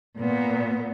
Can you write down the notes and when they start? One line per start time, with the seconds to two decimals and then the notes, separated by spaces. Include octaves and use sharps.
0.19 A#2 B3